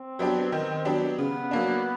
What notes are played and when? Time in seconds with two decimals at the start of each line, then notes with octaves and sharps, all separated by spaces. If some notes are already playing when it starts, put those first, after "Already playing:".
Already playing: C4
0.19 F#3 B3 D4 G4
0.52 D#3
0.85 F#3 B3 D4 G4
1.18 C#3 B3
1.51 F#3 A#3 D4